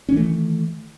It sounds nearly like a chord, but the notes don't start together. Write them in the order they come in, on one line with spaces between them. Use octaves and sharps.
C#4 E3 A3 D#3